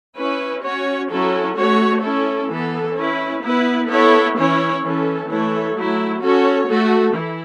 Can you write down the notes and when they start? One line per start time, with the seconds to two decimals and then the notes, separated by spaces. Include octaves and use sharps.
0.17 C#4 E4 B4
0.63 C#4 F#4 C#5
1.10 F#3 C#4 E4 A4
1.57 A3 F#4 C#5
2.03 C#4 E4 A4
2.50 E3 B3 A4
2.96 C#4 E4 B4
3.43 B3 E4 B4
3.89 B3 E4 A4 C#5
4.36 E3 C#4 E4 C#5
4.82 E3 C#4 A4
5.28 E3 A3 E4 A4 C#5
5.75 F#3 A3 E4
6.21 C#4 F#4 A4 C#5
6.68 A3 F#4 A4
7.14 E3 E4